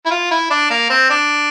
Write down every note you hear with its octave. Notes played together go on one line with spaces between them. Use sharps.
E4
F4
E4
D4
A#3
C4
D4